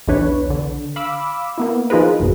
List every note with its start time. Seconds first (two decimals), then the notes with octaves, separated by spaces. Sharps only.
0.08 B1 E2 E3 D4 B4 C#5
0.50 D3
0.96 F5 B5 D6 E6
1.58 A#3 B3 E4
1.90 F3 D#4 F4 G#4 A#4 B4
2.20 A1 F#2 B2